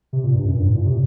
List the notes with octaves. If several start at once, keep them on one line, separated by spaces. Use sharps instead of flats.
C3
A#2
G2
F#2
G2
A2
A#2
C3